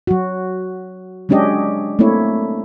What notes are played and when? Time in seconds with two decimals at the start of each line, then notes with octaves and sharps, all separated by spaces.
0.07 F#3 F#4
1.29 F#3 G#3 C#4 D4 G4 D#5
1.99 A3 A#3 C4 E4 C#5